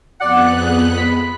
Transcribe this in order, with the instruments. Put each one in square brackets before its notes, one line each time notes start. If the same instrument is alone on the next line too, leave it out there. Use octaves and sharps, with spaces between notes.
[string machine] F2 B3 F#6 [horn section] D5 F#5
[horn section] G#4
G#3 B5